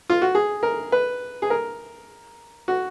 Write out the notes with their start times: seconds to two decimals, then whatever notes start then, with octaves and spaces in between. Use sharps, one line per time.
0.10 F4
0.22 F#4
0.35 G#4
0.63 A#4
0.92 B4
1.42 G#4
1.50 A#4
2.68 F#4